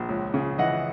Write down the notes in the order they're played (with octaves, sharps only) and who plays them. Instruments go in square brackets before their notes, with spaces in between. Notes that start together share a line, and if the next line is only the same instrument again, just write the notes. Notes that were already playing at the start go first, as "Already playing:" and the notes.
Already playing: [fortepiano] A#1
C#2
C#3
E3 D#5 F#5